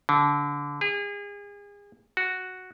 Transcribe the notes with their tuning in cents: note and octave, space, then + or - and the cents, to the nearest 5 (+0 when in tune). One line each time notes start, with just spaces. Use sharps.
D3 -25
G#4 -35
F#4 +0